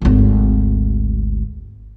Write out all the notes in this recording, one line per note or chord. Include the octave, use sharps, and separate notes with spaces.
G#1 D2